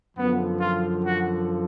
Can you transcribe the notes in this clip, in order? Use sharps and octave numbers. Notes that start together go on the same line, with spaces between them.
F#2 D3 F3 B3
F4
F#4